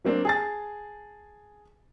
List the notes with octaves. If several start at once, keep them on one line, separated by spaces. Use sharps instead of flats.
F#3 A#3 C4 D4
G#4 A5 A6